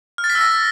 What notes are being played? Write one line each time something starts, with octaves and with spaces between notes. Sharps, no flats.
F6
A6
B6
E6
A#6